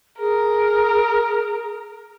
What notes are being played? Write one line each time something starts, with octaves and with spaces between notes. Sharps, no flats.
G#4 A#4